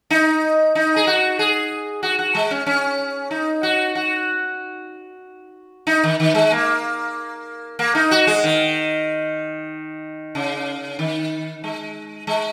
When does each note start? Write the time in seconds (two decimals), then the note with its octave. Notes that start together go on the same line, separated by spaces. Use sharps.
0.10 D#4
0.75 D#4
0.96 G#4
1.07 F#4
1.39 G#4
2.03 F#4
2.19 F#4
2.35 G#3
2.51 C#4
2.66 C#4
3.31 D#4
3.63 F#4
3.95 F#4
5.87 D#4
6.03 D#3
6.20 D#3
6.35 G#3
6.52 A#3
7.79 A#3
7.95 D#4
8.11 F#4
8.27 G#3
8.44 D#3
10.35 C#3
10.99 D#3
11.64 G#3
12.27 G#3